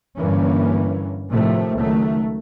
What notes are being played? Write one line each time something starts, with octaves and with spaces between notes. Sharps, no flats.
G2 D3 E3 A#3 C#4
A2 C3 D#3 F3 A3
C#2 D#3 F#3 A3